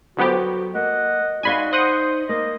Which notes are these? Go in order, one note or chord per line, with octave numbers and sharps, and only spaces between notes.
G1 F#3 B3 F#4 G4 A4 C5
A#3 D#5 F#5
D#4 F#4 D5 F5 G#5 B5 C6
C5 D#5 F#5 C6 D#6
A#3 D#5